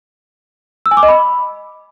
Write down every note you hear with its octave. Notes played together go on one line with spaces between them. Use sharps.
E6
G#5
D6
D#5
B5